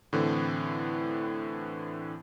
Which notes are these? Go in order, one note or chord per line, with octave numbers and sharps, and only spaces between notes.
A2 D3 E3 C4